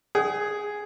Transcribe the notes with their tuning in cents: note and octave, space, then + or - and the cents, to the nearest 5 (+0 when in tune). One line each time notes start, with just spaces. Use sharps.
G#4 +0 G5 -45 D#6 +30